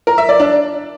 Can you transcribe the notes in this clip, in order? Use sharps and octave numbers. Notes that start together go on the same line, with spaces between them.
A#4
E5
D5
D4